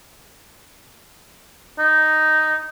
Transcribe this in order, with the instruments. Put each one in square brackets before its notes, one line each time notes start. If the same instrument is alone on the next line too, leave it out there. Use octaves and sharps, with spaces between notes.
[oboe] D#4